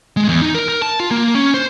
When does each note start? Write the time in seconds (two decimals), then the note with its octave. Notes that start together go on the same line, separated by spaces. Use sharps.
0.17 G#3
0.29 E2
0.42 D#4
0.55 A#4
0.69 A#4
0.82 A5
1.00 F4
1.11 A#3
1.35 C#4
1.54 C5